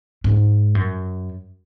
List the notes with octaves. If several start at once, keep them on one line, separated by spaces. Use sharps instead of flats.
G#2
F#2